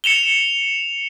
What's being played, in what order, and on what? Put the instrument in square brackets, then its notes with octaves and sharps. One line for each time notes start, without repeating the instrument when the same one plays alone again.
[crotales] C#7 E7 F7 G7